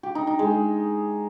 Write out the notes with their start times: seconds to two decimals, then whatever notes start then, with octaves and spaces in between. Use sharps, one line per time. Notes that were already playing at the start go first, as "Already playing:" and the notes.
0.03 G4
0.15 D#4
0.27 D#4
0.39 G#3
0.51 G#3